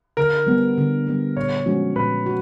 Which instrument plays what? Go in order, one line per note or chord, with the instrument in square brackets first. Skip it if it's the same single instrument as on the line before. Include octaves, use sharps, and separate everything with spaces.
[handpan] D3 [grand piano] A#4
[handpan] G3 B3
D3
G3 B3
[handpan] A#2 [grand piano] C#5
[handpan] F3 G#3 C#4 F#4
[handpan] A#2 [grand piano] B4
[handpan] F#4